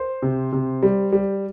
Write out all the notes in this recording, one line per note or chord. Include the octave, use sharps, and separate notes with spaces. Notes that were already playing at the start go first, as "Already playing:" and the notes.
Already playing: C5
C3
C3
G3
G3